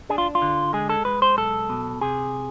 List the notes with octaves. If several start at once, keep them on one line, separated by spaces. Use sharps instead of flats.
D4 G#4
F4
F4
D3
G#3 G#4
A4
G#3 B4
C5
B1 A4
B2
C3 G#4